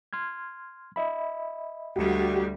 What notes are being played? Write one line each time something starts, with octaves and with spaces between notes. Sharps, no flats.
C6 F6 G#6
D#5 E5 B5
D2 G3 F#4 G4